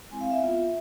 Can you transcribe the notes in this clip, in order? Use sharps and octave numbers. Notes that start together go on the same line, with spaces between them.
G#3 C4 E4 G#5
F5
E5
B3 F4